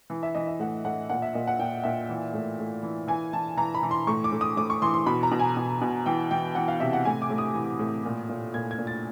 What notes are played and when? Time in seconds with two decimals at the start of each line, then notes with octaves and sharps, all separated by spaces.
0.10 E3
0.23 E5
0.35 E3 D#5
0.47 E5
0.59 A2 F#5
0.85 A2 F#5
1.10 A#2 F#5
1.22 E5
1.34 A#2 D#5
1.47 F#5
1.59 A#2 G5
1.84 A#2 E5
2.09 E3
2.34 A2
2.59 A2
2.83 E3
3.08 E3 G#5
3.33 E3 A5
3.57 E3 A#5
3.74 B5
3.83 E3
3.91 C6
4.07 A2 C#6
4.24 D6
4.32 A2
4.41 D#6
4.57 A2 D6
4.70 C#6
4.82 E3 C6
4.94 C6
5.06 B2 B5
5.23 A#5
5.31 B2
5.39 G#5
5.57 B2
5.81 B2
6.06 E3 G5
6.31 E3 G5
6.55 E3 F#5
6.68 F5
6.80 C3 E5
6.93 F#5
7.05 A2 G#5
7.22 D6
7.30 A2
7.38 D#6
7.54 E3
7.79 A2
8.05 A#2
8.29 A#2
8.54 A#2 G#6
8.71 G#6
8.79 A#2
8.87 A6